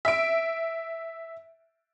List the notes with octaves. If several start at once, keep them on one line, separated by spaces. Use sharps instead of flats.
E5 D7